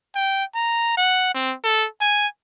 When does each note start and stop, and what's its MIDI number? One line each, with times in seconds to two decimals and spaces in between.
0.15 0.44 79
0.55 0.94 82
0.97 1.30 78
1.34 1.54 60
1.63 1.87 69
2.01 2.27 80